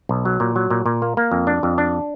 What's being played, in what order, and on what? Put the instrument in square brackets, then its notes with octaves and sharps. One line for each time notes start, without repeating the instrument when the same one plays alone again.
[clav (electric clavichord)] B1
F#3
A#2
F#3
A#2
A#2
A#3
A#3
F2
D4
F2
D4